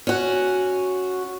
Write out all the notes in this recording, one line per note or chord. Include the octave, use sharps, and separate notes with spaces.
C#4 F#4